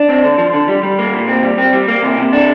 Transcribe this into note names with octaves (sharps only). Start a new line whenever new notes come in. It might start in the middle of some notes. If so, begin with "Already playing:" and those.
Already playing: D4
C4
D3
F3
D3
G3
G3
A#3
A#2
C4
G3
C4
G3
A#3
C3
C3
D4